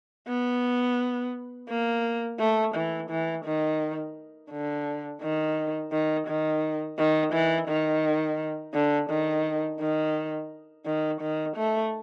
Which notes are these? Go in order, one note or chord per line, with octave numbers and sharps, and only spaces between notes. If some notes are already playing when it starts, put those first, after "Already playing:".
B3
A#3
A3
E3
E3
D#3
D3
D#3
D#3
D#3
D#3
E3
D#3
D3
D#3
D#3
D#3
D#3
A3